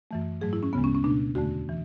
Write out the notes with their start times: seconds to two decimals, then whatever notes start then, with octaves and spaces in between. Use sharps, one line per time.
0.11 F#2 E3 A3
0.41 G#2 F#3 A3 G#4
0.53 E4
0.63 C#4
0.73 D2 C#3 G#3 B3
0.84 C#4
0.95 C#4
1.04 B2 A3 D4
1.35 E2 D3 A3 F#4
1.69 E3